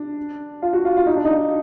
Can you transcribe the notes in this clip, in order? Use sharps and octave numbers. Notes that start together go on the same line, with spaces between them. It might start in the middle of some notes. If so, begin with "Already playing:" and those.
Already playing: D4
F4
F#4
F4
F4
D#4
D4
D#4